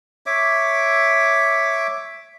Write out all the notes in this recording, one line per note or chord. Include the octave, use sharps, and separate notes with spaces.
C#5 E5 D6